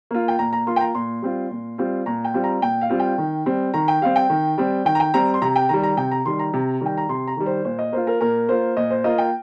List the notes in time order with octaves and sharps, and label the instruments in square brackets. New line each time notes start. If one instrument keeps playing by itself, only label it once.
[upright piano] A#3 F4
G5
A#2 A#5
A#5
A#3 F4 C6
G5
A#5
A#2 C6
G3 C4 F4
A#2
G3 C4 F4
A#2 A#5
G5
G3 C4 F4
A#5
A#2 G5
F5
G3 C4 F4
G5
D#3
G3 C4
D#3 A#5
G5
G3 C4 F5
G5
D#3
G3 C4
D#3 G5
A#5
G5
G3 C4 A#5
C6
C3 A#5
G5
D#3 G3 A#5
A#5
C3 G5
A#5
D#3 G3 C6
A#5
C3
D#3 G3 G5
A#5
C3 C6
A#5
D#3 G3
C5
A#2 C5
D#5
A#3 F4 C5
A#4
A#2 A#4
A#3 F4 C5
A#2 D#5
C5
A#3 F4 D#5
G5